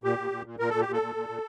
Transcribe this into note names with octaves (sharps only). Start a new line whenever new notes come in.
A#2 G4
A#2
A#2
A#2
A#2 A#4
A#2 A4
G4
A#2
A4
A#2
A#2
A#2